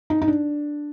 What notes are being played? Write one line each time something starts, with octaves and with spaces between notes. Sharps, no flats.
D#4
D#4
D4